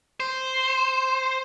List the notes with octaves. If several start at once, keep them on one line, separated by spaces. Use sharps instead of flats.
C5